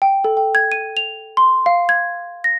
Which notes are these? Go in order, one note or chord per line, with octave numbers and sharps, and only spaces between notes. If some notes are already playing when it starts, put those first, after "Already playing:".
G5
A4
G5
G#6
D#7
F7
C6
F5
G#6
A#6